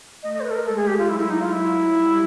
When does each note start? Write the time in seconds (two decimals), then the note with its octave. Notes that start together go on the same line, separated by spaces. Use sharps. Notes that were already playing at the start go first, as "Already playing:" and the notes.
0.23 A3 D#5
0.34 D#5
0.40 C5
0.44 B4
0.50 A4
0.55 A#4
0.66 G#3 A4
0.77 G#4
0.87 G4
0.98 F4
1.08 F#3 E4
1.19 E4
1.30 D#4
1.41 F4
1.52 E4
1.94 G3